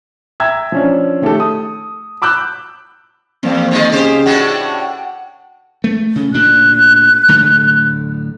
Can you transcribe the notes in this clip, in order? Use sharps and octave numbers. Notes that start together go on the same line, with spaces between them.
E5 G5 A#5 E6 G#6
F3 C#4 D4
D#3 A3 G4 A4
D#6
B5 D6 E6 F#6 G6
E2 F3 A#3 C4
D3 D#3 G3
C#3 C#4 G4 G#4 C5
A2 D4 F#4 F#5 G5
A3
C#3
D2 A#2 D4 F#6
D1 D3 A3